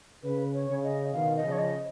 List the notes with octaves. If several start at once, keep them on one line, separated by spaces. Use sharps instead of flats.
C#3 B4
C#5
C#3
D#5
B2 D#3 F5
D#5
C#3 F3
C#5
D#5